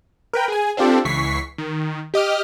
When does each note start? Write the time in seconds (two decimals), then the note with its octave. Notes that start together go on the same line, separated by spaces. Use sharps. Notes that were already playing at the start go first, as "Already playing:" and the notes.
0.33 A#4 B4 G5
0.48 G#4 G#5
0.77 C4 D4 F4 G4 A4
1.05 C#2 E3 C#6 B6 C7
1.58 D#3
2.14 G4 D#5 D6 F6